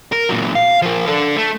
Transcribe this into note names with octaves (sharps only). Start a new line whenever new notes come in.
A#4
A#2 F#3
F5
F3 A#4
D4 A4
A3